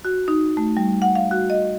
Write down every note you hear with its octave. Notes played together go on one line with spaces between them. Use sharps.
F#4
D#4
A3
G3
F#5
F5
F#4
D#5